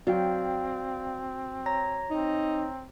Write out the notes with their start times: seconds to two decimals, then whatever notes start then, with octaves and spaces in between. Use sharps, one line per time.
0.07 F#3 C4 D5 F5 G5
1.66 C#5 A#5 A#6
2.10 C4 D#4